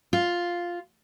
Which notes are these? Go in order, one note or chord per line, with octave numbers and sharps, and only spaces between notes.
F4